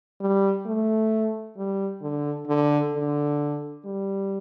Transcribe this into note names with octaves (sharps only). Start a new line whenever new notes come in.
G3
A3
G3
D3
D3
D3
G3